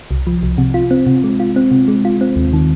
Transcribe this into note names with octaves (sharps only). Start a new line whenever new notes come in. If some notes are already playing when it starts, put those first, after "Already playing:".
C2
F3
C2
C3
F4
C4
C3
G#3
F4
C4
C3
G#3
F4
C4
D#2
D#3